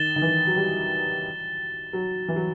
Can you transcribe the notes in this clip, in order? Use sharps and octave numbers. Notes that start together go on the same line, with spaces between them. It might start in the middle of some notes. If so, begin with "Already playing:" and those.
Already playing: D#3 A6 E7 G7
D#3
E3
F#3
G3
F#3
E3
F#3